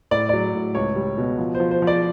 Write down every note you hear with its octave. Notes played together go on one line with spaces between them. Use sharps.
A2 D5
F#3 D5
A2
C#2 C#5
G3
B2
F3
C5
F3
C5
F3
D5